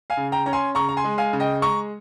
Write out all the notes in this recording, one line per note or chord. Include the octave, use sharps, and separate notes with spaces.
F5 G#5
C#3
G5 A#5
C#4 A#5
G#5 C6
C#3 A#5 C#6
A#5
G#5 C6
G#3
F5 G#5
C#3
D#5 G5
G#3 A#5 C#6